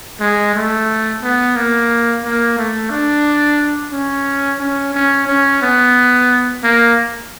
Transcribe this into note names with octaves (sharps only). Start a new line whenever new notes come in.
G#3
A3
B3
A#3
A#3
A3
D4
C#4
C#4
C#4
C#4
B3
A#3